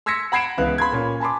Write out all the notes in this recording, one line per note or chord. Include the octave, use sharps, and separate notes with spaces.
C6 E6 G#6 A#6 B6 C#7
F#5 B5 G#6 C7 D7 E7
C#2 E3 B3 F5 F#6
B5 C6 G#6
A#2 C#4
G#5 A5 B5 C6 D6